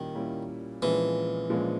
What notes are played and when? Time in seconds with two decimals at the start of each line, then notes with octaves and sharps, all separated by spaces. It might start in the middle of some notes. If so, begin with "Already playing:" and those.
Already playing: A#2 D#3 G3 A#3 C#4 E4
0.15 A#2 G3 A#3 C#4 E4
0.82 A#1 A#2 E3 F3 G#3 C#4
1.50 A#1 A#2 F3 G#3 C#4